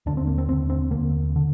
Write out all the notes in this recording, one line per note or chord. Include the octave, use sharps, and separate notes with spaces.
D#2 D3 D4
C4
A#3
C4
D#2 D3 C4
C4
D#2 D3 A#3
D3